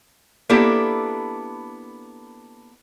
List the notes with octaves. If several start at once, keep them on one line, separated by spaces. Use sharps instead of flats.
A#3 B3 D4 E4 G4 A4